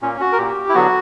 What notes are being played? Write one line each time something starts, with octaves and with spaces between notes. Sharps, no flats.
A#2 A#3 C#4
F#4
A#4
A#2 A#3 G4
E4
D3 F#3 B3 F#4